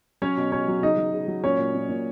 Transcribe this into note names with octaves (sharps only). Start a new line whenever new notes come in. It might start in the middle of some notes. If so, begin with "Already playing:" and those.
F#3 C#4 C#5
B2
B2 C#4 C#5
F#3
C#3 D#4 D#5
F#3
C#3
F#3
A#2 C#4 C#5
A#2
A#2
A#2